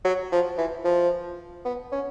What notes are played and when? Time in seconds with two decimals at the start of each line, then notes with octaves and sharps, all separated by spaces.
0.04 F#3
0.32 F3
0.58 E3
0.84 F3
1.65 B3
1.92 C#4